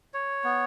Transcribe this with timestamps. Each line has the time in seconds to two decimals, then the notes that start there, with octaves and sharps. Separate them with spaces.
0.14 C#5
0.44 B3